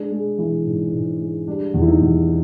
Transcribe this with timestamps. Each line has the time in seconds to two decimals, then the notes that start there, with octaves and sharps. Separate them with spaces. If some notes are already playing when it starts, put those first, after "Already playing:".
Already playing: G#3 D4
0.11 G#3
0.39 E3
0.66 G#2
0.92 G#2
1.20 G#3
1.48 G3 D4
1.74 E2
1.81 E4
1.88 D#4
2.01 E2